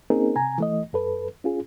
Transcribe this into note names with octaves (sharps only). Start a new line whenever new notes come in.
A#3 C4 C#4 D#4 G#4 A#4
C3 G#5 A#5
E3 A3 D#5
F#2 A4 B4
C#4 F4 G#4